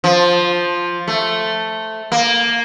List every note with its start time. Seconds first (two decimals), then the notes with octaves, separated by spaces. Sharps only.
0.04 F3
1.08 A3
2.12 A#3